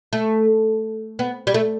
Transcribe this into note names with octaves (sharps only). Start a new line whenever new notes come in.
A3
B3
G3
A3